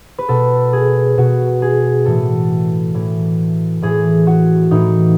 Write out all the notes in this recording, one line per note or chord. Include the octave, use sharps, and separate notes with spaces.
B4
B2 A4
G#4
B2 F#4
G#4
A2 E3 A4
A2 E3
A2 E3 G#4
F#4
A2 E3 D#4